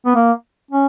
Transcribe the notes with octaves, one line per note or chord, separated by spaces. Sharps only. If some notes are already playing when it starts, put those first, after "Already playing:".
B3
A#3
C#4